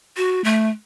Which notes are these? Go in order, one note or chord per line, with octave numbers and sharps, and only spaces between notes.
F#4
A3